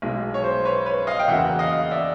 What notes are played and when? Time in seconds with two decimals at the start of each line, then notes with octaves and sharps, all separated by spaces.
0.02 B1 B2 G#3
0.34 C#5
0.44 C5
0.65 B4 C#5
0.86 B4 C#5
1.07 D#5 F5
1.19 G5
1.28 E2 C#3 F#3 A#3 E5 F#5
1.59 D#5 F5
1.91 D5 E5